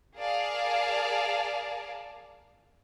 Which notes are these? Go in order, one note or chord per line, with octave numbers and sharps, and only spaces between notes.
G#4 A#4 D5 F5 A5